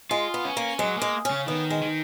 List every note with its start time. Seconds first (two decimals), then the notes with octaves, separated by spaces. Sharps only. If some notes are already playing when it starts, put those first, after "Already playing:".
0.11 G#3 F4
0.34 B3
0.45 C#4
0.57 A#3
0.79 F#3 G#3
0.97 G#3 A#3
1.25 C#4
1.31 C#3
1.47 D#3 B3
1.70 G#3
1.82 D#3